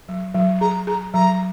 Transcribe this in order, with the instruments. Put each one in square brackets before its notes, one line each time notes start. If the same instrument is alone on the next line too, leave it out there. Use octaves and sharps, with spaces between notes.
[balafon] F#3
F#3
[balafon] G#4 [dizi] A#5
[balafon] G#4 [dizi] A#5
[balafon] F#3 [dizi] A#5